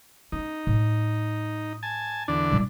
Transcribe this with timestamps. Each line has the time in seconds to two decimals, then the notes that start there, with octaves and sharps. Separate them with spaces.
0.32 C#4 D#4
0.67 A2
1.83 G#5 A5
2.28 E2 D3 D4
2.51 A#2 G3